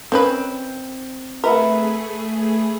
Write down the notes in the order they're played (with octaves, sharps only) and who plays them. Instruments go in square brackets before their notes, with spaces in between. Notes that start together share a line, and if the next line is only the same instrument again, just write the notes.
[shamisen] D#3 C#4 B4 [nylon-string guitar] C4
[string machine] A3 G#4 [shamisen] A#4 [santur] B4 E5 F#5